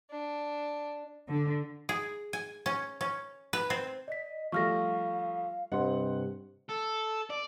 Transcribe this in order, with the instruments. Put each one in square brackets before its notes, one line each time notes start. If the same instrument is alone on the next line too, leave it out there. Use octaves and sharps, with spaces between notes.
[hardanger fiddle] D4
[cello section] D3
[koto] G#4
G#5
C#4
C#4
B4
C4
[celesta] D5 B6 [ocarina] D#5
[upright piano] F3 G3 A3 [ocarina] F5 [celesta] C#6 F6 A#6
[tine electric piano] G2 C3 [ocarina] C5 [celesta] D#5 C6 [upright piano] F#5
[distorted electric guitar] A4
D5